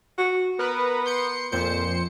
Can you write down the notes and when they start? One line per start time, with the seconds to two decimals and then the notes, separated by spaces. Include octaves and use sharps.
0.18 F#4
0.59 B3 A#4 B4
1.06 C6 G6 C#7
1.52 F2 A#2 C5 C#7